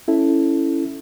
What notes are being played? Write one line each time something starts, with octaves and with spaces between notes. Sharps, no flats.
C#4 E4 A4